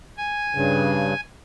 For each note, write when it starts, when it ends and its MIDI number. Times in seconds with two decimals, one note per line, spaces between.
0.17 1.21 80
0.55 1.14 43
0.55 1.14 49